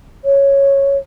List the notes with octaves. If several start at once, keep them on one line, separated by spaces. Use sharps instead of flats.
C#5